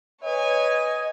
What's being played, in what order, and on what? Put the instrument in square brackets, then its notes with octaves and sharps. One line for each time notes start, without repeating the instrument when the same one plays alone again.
[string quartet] B4 C#5 G#5 [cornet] D#5